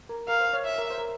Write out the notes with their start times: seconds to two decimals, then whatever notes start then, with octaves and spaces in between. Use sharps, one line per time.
0.09 A#4
0.28 A#4 F5
0.41 C5
0.53 C#5
0.65 E5
0.78 A#4
0.90 C5
0.98 A#4